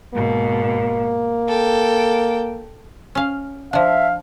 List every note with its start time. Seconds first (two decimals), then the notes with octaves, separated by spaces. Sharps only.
0.14 G#2 B2 A#3
1.48 A4 G5
3.15 C#4 F5
3.73 F3 D4 E5 F5